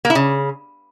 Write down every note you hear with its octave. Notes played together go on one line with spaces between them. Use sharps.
A#3
E4
C#3